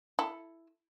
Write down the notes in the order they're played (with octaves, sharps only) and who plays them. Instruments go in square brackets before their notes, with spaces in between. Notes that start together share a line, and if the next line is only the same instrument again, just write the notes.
[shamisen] E4 A4